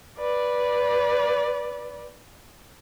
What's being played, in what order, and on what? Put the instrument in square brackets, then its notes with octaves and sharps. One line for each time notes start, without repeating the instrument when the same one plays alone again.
[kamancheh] B4 D5